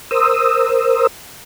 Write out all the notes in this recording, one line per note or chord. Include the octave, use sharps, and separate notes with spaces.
A#4 C5 D#6 E6